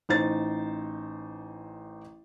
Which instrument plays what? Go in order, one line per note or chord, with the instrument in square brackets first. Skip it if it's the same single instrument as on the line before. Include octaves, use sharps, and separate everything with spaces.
[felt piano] A1 D#4 C5 A6